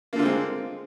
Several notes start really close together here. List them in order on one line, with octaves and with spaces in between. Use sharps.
A#3 D3 F4 C4 G#3